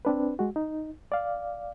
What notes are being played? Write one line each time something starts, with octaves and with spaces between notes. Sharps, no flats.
C4 D4 B4
G#3 F#4
D#4
D5 F5